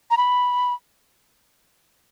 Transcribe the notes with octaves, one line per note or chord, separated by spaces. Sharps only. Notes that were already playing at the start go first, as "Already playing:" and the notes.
A#5
B5